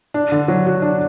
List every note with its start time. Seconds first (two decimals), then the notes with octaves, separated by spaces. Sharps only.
0.14 D4
0.32 D3
0.48 F#3
0.66 F#4
0.82 D4